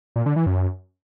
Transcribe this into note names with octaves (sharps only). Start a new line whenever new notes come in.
A#2
D3
E3
F#2